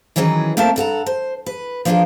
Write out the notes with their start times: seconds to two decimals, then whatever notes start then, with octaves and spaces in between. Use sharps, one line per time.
0.16 D#3 E3 F#3 C#4 G#4 B4
0.57 A3 A#3 C4 A#4 E5 A5
0.76 G2 A4 F#5 A#5
1.06 C5
1.46 B4
1.85 F3 D4 F4 F#4 G#4 A#4